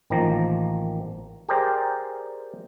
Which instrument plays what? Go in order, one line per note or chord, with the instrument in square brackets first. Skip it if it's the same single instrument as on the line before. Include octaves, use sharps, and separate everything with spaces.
[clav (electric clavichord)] A1 D#3 F3 A#3 A#5
G4 G#4 A#4 C5 D5